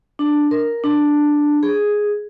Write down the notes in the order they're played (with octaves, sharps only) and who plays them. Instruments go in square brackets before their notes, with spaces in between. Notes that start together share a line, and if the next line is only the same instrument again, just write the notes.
[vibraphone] D4
A#4
D4
G#4